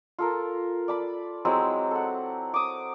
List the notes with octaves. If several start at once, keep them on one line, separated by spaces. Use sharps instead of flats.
F4 A4 A#4
D5 A5 B5
F#3 G#3 C4 E4
A4 F#5
D6 D#6